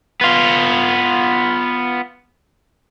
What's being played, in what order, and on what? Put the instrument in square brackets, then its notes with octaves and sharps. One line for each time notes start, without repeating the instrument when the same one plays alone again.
[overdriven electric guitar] B3 F4